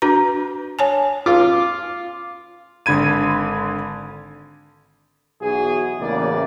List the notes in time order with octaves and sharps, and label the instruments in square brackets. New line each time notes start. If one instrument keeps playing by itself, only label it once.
[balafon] D4 F#4 B4 A#5
C#5 G#5 A5
[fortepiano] F4 D6
[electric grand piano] G#1 D3 B5 G#6 D#7
[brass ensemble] B1 E3 F#4 G#4
A1 E2 C#3 A#3 D5